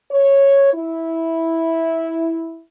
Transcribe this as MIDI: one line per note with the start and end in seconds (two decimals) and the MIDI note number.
0.10 0.72 73
0.73 2.60 64